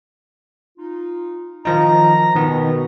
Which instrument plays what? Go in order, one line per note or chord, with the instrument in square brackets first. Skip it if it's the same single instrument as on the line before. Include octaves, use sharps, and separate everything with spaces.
[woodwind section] D#4 F4
[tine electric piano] D#3 F3 D#4 [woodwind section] A#5
[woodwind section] B2 [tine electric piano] D#3 B3